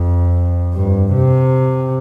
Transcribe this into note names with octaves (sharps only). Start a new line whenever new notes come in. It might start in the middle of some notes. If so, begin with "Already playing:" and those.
Already playing: F2
G2
C3